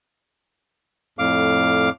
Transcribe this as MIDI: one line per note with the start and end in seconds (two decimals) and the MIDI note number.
1.19 1.90 41
1.19 1.90 45
1.19 1.90 77
1.19 1.90 86